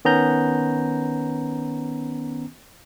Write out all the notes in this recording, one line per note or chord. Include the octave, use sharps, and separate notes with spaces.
D#3 B3 C#4 A#5 G6